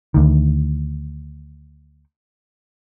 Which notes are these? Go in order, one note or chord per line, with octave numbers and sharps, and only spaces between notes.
D2 D#3